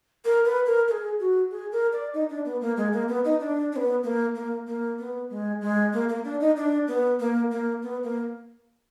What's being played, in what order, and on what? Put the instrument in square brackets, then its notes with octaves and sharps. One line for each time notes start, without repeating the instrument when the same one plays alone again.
[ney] A#4
B4
A#4
A#4
G#4
F#4
G#4
A#4
D5
D#4
D4
B3
A#3
G#3
A#3
B3
D#4
D4
D4
B3
A#3
A#3
A#3
B3
G#3
G#3
A#3
A#3
D4
D#4
D4
B3
A#3
A#3
B3
A#3